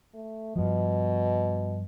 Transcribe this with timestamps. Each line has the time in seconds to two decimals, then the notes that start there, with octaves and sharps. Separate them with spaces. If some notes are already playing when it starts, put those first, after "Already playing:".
0.14 A3
0.56 G2 B2 F3